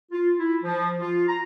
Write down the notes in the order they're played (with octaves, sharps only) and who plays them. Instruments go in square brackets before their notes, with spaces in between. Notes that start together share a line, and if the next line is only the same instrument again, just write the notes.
[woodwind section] F4
E4
F3
F4
A#5